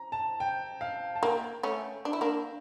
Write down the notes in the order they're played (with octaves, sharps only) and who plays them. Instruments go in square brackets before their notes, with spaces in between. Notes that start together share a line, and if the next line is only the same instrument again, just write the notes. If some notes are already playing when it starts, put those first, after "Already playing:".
Already playing: [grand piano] A#5
A5
G5
F5
A5
[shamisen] A#3 [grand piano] G5
[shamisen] A3 C#4
D4
E4
A#3 D4